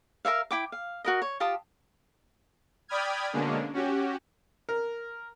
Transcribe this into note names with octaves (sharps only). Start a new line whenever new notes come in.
A#4 C#5 E5 F5
E4 G5 D6
F5
F#4 A#4 D#5
C#5
F4 G4 A5 D#6
D5 G5 B5 D#6 F6 G#6
B2 D3 G#3 A#3 C#4 D4
C#4 F#4 G4
A#4